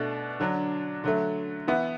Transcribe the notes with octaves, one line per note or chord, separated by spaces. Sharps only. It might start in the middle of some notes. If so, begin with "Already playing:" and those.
Already playing: B2 A3 D4
D3 F#3 D4
D3 F#3 A3
E3 B3 E4